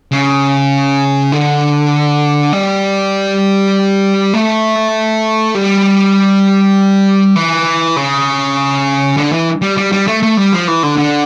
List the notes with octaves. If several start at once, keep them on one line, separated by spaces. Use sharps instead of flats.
C#3
D3
G3
A3
G3
E3
C#3
D3
E3
G3
G3
G3
A3
A3
G3
F3
E3
D3
D3